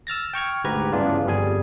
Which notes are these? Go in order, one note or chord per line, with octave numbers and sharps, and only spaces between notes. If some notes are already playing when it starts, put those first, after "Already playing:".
E6 F6 A6 A#6
G5 C#6 F6 G#6
D2 G#2 G4 B4 A#5 G#6
G2 C#3 E3 B3 D4 F4
G1 F2 G3 G#4 G#5